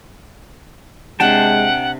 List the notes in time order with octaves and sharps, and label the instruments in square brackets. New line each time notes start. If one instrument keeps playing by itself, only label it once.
[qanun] C3 D4 C5 [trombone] G#3 [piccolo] F#5 [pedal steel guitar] G5 A5